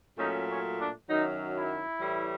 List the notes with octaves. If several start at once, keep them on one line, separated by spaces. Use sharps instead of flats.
A#2 F#3 A3 C#4 D#4
C#4
D4
F#2 D#3 F#3 D#4
E4
A2 E3 G3